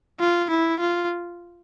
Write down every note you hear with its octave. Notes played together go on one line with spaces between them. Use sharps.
F4
E4
F4